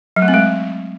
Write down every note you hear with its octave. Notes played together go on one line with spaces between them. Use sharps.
F#3
A3
C4
G#3